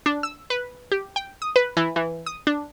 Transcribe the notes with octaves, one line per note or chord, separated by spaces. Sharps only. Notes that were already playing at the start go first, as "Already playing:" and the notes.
D4
E6
B4
G4
G5
D#6
B4
E3
E3
D#6
D4